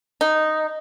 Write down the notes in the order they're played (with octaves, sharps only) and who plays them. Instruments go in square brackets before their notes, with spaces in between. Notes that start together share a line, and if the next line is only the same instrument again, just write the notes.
[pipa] D#4